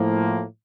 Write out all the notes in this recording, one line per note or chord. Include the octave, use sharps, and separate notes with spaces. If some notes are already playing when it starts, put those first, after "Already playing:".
Already playing: A2 F3 A#3